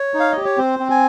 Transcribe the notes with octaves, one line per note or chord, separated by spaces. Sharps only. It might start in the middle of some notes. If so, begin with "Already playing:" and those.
Already playing: C#5
D#4
F5
G4 D#5
C#5
C4 C5
C4
G#5